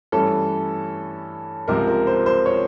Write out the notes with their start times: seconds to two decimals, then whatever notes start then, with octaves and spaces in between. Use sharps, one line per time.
0.12 G2 E3 A3 C#4 A4
1.68 C#2 C3 F3 A#4
1.88 A#4
2.07 C5
2.26 C5
2.46 C#5